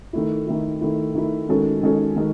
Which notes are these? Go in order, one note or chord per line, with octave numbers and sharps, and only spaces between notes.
D#3 A3 E4
D#3 A3 E4
D#3 A3 E4
D#3 A3 E4
D#3 G#3 C#4 F#4 A4
D#3 G#3 C#4 F#4 A4
D#3 G#3